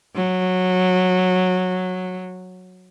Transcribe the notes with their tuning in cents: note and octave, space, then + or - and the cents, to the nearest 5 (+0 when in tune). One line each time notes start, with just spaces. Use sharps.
F#3 -15